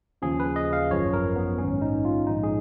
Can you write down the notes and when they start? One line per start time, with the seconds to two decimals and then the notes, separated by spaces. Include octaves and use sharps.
0.22 D#2 C#3 F3 G#4
0.40 B4
0.56 D#5
0.73 F5
0.90 G#1 F#2 F3 C#5
1.13 A#4
1.36 B3
1.58 A#1 G#2 D#3 C#4
1.82 D#4
2.05 F4
2.27 A#1 G#2 F3 D#4
2.43 G#4